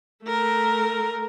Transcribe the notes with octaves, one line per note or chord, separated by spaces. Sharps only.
A3 A#4